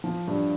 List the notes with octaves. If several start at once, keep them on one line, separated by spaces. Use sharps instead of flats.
F3
G2